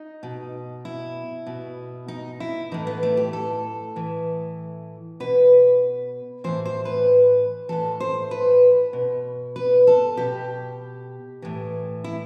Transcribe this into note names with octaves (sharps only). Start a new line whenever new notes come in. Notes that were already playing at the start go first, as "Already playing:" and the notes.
Already playing: D#4
B2
E4
B2
D#4
E4
A2 E3 D#4
B3
A3
G4
A4
A2 E3
B2 B4
A2 E3 C5
C5
B4
A2 E3 A4
C5
B4
B2
B4
A4
B2 G4
A2 E3
E4